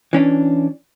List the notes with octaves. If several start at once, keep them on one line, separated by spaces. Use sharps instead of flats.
E3 C#4 D4